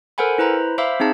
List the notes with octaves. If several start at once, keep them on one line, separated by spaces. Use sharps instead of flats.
A4 A#4 C5 F#5 G#5 B5
E4 B4 C5 A#5 B5
C5 E5 F5 B5 D6 E6
C4 D#4 G#4 A5